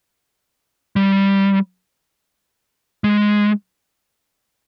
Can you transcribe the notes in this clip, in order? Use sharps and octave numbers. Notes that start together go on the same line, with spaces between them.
G3
G#3